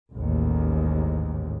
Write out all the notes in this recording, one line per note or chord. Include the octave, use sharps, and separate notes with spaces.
A1 D#2 G#2